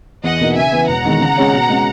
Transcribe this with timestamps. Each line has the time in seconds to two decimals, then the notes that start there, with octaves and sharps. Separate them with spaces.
0.24 E2 D#5 F#5
0.41 B2 A#3 D#4
0.56 C#3 E5 G#5
0.72 E3 B3
0.88 E1 F#5 A#5
1.05 E2 D#3 G#3
1.21 C#3
1.38 G#3 C#4 G#4 C#5
1.53 B2
1.69 G#3 C#4